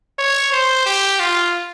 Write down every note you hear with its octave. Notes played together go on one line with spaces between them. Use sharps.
C#5
C5
G4
F4